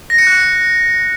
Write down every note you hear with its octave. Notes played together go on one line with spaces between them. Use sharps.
A#6
C#7
F#6